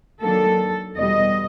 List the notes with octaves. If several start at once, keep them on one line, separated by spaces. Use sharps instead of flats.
D#3 F#3 A#3 D4 A4
E2 B2 G3 D#5